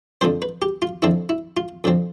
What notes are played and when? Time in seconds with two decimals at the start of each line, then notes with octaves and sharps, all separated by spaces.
0.21 F2 D3 F3 C4 C5
0.42 B4
0.62 G4
0.82 F4
1.02 F2 D3 F3 C4 E4
1.29 E4
1.57 F4
1.84 F2 D3 F3 C4